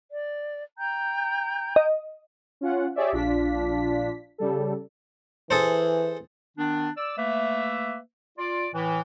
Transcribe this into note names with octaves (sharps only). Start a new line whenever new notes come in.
D5
G5 A#5 G6
D#5
C#4 F4 F#5
G4 G#4 C#5 D5 E5
A#1 D4 F4 B6
C#3 G3 A4
E3 G#4 A4 C5
D#3 B3 D4
D5 E6
A3 A#3 B4 E5
F4 D5
A2 E3